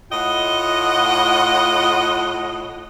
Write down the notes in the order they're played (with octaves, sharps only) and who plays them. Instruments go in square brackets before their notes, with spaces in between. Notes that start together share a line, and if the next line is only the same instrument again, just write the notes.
[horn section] A2 F4 D#5 F#5